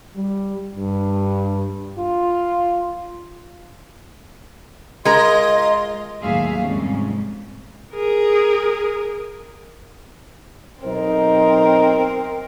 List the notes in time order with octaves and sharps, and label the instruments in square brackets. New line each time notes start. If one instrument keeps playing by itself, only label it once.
[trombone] G3
G2
F4
[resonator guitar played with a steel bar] G#3 A#4 [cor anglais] F4 [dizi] D#5
[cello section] D#2 A2 F#3 G#4 E5 F5
F2 G#2 C3 G3 C#4
[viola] G#4 A#4
[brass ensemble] B1 D#4 C5 [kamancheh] C4 A#4